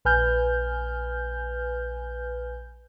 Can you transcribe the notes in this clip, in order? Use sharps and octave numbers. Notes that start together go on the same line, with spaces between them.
A#1 B4 G#5 F6 G6